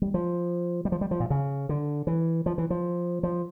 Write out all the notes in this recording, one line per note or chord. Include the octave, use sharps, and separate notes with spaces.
G3
F3
G3
F3
G3
F3
A#2
C#3
D3
E3
F3
E3
F3
F3